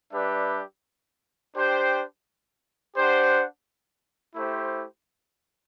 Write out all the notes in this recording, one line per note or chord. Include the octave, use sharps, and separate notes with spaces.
G3 D4 G4 B4 E5
D4 G4 C5 G5
D4 G4 C5 F#5
A3 E4 G4 C5